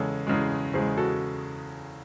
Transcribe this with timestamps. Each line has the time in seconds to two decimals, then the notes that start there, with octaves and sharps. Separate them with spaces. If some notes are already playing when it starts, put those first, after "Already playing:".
Already playing: E2 C#3 G#3 A4 C#5
0.27 E2 C#3 G#3
0.74 E2 C#3 G#3 G#4 C5
0.97 F#4 A4